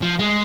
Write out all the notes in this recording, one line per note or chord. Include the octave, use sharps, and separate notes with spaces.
F3
G#3